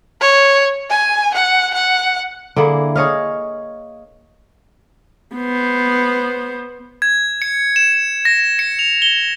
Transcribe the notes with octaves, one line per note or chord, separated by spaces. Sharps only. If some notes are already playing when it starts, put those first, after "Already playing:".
C#5
G#5
F#5
F#5
D3 A#3 E4 G#4
G#4 C#5 D#5 F5
B3 C5
G#6
C#7
E7
A#6
C#7
F7
G7